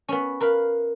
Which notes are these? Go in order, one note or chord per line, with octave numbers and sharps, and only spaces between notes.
B3 C#4
A#4 B4 F5